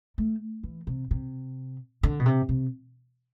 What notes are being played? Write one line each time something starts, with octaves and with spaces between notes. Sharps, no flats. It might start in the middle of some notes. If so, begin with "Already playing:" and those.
A3
E3
C3
C3
D3
B2
C3
C3